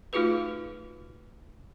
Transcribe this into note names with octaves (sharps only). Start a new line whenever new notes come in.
A3 D#4 F4 F#4 G#4 B4